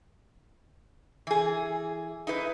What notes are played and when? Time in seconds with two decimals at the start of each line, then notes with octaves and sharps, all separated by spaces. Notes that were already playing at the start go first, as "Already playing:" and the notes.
1.27 E3 G#4
2.27 D#4 E4 B4